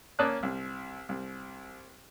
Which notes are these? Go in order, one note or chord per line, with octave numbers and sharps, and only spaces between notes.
A#3 C#4 D5 A5 D#6 F#6
C2
C2